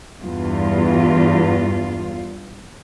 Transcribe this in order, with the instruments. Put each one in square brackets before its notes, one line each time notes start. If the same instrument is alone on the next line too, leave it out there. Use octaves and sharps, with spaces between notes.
[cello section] E2 G2 F4